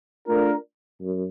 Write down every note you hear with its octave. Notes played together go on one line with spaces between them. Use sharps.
A3 D4 F4 A#4
F#2